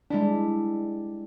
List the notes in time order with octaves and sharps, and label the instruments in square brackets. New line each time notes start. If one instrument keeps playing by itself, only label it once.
[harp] G3 E4 [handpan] G#3 D4